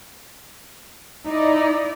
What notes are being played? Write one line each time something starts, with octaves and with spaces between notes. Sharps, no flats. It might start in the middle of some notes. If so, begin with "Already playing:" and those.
D#4 E4 D5